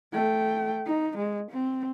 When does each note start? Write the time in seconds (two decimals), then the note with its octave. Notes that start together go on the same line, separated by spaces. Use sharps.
0.13 A3 G5
0.87 D#4
1.18 G#3
1.51 C4